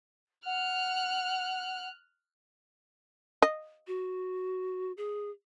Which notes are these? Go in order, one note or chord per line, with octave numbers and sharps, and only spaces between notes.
F#5 F6 F#6
D#5
F#4
G#4